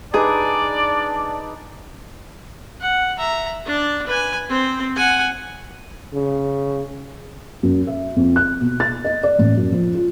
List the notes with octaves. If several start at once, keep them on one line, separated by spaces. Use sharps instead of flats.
D4 D#4 G#4 B4 D5
F#5
E5 A#5
D4 D5
B4 G#5
C4 C5
F#5 G#5
C#3
F#2
E5
F2
F#6
B2
A6
D#5
D5
A1
F#2
F3
F4